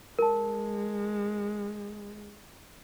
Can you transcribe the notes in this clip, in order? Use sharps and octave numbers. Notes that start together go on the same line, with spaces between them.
G#3 A#4 A5